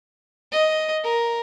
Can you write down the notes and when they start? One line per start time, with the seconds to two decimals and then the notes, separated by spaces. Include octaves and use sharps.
0.52 D#5
1.04 A#4